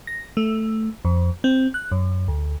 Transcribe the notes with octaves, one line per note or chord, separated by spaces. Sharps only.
A#6
A3
F2
C4
F#6
F#2
D2